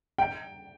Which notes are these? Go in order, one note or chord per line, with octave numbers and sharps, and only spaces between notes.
G5